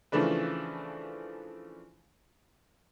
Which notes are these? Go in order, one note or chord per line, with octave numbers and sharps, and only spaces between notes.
C#3 E3 F3 A3 D4 B4